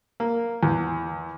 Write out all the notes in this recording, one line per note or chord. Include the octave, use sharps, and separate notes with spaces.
A#3
E2